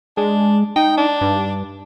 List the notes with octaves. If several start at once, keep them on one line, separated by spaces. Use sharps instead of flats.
G#3 D4
D#4 G5
D4
G2